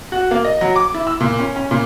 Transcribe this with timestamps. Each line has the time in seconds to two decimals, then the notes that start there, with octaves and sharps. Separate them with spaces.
0.12 F#4
0.31 A#3
0.44 D#5
0.61 F#3
0.76 D6
0.94 E4
1.07 E6
1.20 A#2
1.39 C#4
1.56 C#4
1.71 A#2